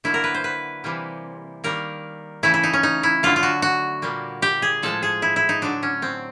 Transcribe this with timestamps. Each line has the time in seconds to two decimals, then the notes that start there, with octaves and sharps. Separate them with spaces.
0.04 D3 F#3 A#3 E4
0.14 A#4
0.24 B4
0.34 C5
0.44 B4
0.84 C3 E3 G3 A#3
1.64 D#3 G3 A#3 A#4
2.43 C#3 E3 A3 E4
2.54 E4
2.63 D#4
2.73 C#4
2.83 D#4
3.03 E4
3.23 D3 F#3 A3 F4
3.36 F4
3.43 F#4
3.62 F#4
4.02 A#2 G3 A#3
4.42 G4
4.62 G#4
4.82 A2 F3 G#3 A4
5.03 G#4
5.22 E4
5.36 E4
5.49 D#4
5.62 D3 F#3 A3 D4
5.83 C#4
6.02 C4